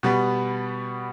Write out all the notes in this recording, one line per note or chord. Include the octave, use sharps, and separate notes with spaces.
B2 G3 B3